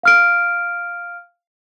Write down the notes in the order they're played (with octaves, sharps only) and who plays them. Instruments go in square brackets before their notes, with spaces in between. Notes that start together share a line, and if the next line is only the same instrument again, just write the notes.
[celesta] F5 F6 D7